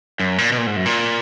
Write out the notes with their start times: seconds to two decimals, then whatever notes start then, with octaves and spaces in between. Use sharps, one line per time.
0.19 F#2
0.38 A#2
0.52 B2
0.58 A#2
0.67 G#2
0.76 F#2
0.86 A#2